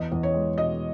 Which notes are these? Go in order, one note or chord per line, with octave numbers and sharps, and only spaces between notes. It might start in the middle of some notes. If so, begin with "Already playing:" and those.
Already playing: E2 D#5
E2
C#5
G#3
B2 D#5